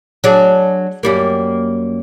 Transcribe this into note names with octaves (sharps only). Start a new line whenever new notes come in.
F#3 D4 G#4
F#2 G3 A#3